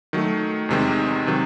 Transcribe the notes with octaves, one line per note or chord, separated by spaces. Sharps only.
D#3 F#3 A3
E2 C3 D#3 G#3
C3 D#3 F#3